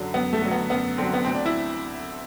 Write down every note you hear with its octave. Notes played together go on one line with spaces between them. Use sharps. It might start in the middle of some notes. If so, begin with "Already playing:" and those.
Already playing: F#2 D3 F#3
F#2 B3
A3
D3 F#3
B3
F#2 B3
D3 F#3 C4
B3
D2 C4
D4
E4